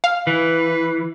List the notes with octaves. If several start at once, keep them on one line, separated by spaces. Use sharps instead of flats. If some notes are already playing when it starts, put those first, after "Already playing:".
F5
E3 B4